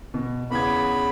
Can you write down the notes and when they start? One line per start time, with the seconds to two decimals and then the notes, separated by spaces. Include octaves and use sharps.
0.14 B2
0.51 E2 C#3 B3 B5 G#6